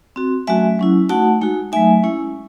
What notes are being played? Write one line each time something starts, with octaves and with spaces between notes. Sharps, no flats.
C4 F#4
F#3 A3 C#4 F#4 E5 G#5
F#3 C#4 E4
A3 D#4 F#4 F#5 A5
G#3 D#4 F#4
F#3 A3 D#4 E5 G#5
G#3 C#4 E4